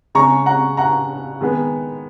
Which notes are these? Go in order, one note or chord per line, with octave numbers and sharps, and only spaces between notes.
C#3 G#3 C#4 A#5 C#6
F#5 A#5
F#5 A#5
D#3 G#3 B3